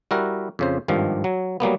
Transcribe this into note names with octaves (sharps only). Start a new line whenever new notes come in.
G3 E4 F#4 A#4
F2 C#3 C5
G#1 G2 D#3 F3
F#3
F#3 G3 A#3 B3